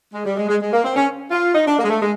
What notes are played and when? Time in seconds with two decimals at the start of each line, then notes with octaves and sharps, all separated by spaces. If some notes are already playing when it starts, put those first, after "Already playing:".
0.13 G#3
0.25 G3
0.37 G#3
0.48 G#3
0.60 G#3
0.72 A#3
0.84 C4
0.95 C#4
1.31 F4
1.55 D#4
1.66 D4
1.77 A#3
1.84 G#3
1.89 A3
2.01 G#3